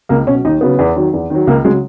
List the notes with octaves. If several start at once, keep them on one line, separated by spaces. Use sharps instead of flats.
C#2 A#3
B2 F#3 C#4
D#2 D#4
C#3 F#3 B3
E2
D#3 F#3
E2
D#3 F#3
C#2 A#3
C#3 F#3 G#3